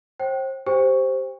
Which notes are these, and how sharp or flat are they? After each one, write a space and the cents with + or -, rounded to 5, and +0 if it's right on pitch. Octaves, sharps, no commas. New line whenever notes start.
C5 +35 G5 -25
G4 +0 C5 +0 G5 +35